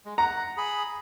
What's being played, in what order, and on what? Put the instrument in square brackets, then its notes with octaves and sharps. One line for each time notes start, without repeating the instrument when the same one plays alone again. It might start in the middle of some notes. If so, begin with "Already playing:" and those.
[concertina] G#3
[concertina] F#5 [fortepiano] A#5
[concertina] G#4 B5